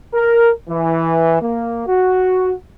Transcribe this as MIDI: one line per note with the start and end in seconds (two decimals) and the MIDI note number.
0.13 0.48 70
0.68 1.40 52
1.40 1.82 58
1.86 2.51 66